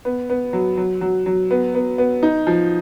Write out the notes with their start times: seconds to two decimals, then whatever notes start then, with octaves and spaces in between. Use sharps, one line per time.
0.05 B3
0.30 B3
0.53 F#3
0.77 F#3
1.01 F#3
1.26 F#3
1.51 B3
1.75 B3
1.98 B3
2.23 D#4
2.47 F3